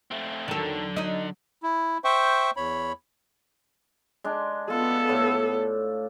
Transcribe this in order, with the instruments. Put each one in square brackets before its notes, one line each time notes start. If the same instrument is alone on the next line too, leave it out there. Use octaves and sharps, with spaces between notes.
[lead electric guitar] A3 C4
[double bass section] E2 F#3 [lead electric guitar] D3 [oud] D#3 A4
[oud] D#4 D#5
[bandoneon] E4
C5 E5 G5 C#6
E2 C#5 B5
[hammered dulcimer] G#3 D4
[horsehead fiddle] B3 A4 [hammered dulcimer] F4
[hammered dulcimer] A2